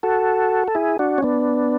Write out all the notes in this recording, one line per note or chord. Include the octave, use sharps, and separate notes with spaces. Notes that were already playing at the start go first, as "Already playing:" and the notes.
F#4 A4
A4
E4 G#4
D4 F#4
C#4
B3 D4